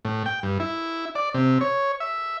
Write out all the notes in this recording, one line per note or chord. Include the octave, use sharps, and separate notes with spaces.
A2
G5
G2
E4
D5
C3
C#5
E5